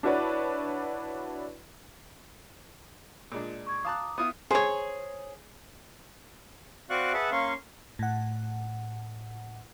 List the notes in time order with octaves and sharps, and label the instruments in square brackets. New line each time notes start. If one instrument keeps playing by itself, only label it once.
[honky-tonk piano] D4 E4 F#4 B4 C#5 D5
[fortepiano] A#2 G#3 D4
[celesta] C#6 G#6
[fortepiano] F5 A5 F#6 [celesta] A#5 D6 D#6
[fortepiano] B3 E4 F4 [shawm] D#6
[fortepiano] G#4 [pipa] C5 C#5
[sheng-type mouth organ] C4 F#4 D5 F5 C#6 F#6
G#4 B4 E5 F#5 A5
A#3 C#4 F5 C6 C#6
[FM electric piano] A2 F#5